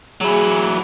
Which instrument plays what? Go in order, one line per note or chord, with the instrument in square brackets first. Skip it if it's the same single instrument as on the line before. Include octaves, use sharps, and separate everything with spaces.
[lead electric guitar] F#3 E4 [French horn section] G#4